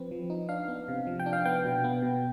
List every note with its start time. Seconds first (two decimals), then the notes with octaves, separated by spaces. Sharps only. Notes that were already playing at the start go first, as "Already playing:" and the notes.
Already playing: F3 C4 B4
0.11 F3
0.30 D#4
0.49 D4 F5
0.68 B3
0.88 C3
1.07 F3
1.19 G5
1.26 D4
1.33 F5
1.45 B3 G5
1.64 B2
1.84 B3
2.02 B2